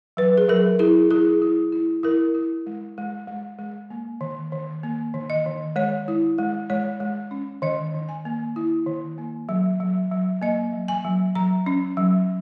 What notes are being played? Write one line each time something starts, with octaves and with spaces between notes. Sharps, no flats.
F#3 B4
G#4
F#3 A#4
E4 G#4
E4 G#4
E4
E4
E4 A#4
E4
G#3
G#3
G#3
G#3
A#3
D#3
D#3
A#3
D#3
D#5
D#3
G#3 C#5
E4
G#3
G#3 C#5
G#3
C#4
D#3 D#5
D#3
G#5
A#3
E4
D#3
A#3
F#3
F#3
F#3
A#3 D#5
F#3
G#5
F#3
F#3 A#5
C#4
F#3